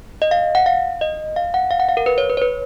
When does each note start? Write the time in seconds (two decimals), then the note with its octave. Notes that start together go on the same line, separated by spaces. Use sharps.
0.22 D#5
0.31 F5
0.55 F#5
0.66 F5
1.01 D#5
1.36 F5
1.54 F#5
1.71 F5
1.80 F#5
1.89 F5
1.97 A#4
2.06 B4
2.18 C#5
2.30 B4
2.37 C#5
2.42 B4